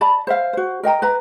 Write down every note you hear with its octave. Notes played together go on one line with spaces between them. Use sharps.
D5 A5 B5
C5 E5 F5
F#4 C5
A#4 D#5 G5 A#5
B4 A#5